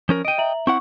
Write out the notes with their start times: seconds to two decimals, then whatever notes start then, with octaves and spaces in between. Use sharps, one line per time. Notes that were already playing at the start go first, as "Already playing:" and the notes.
0.09 F3 C#4 A#4
0.25 D#5 G5 D7 D#7
0.38 E5 A#5 F#7
0.67 C4 E4 F#5 C#6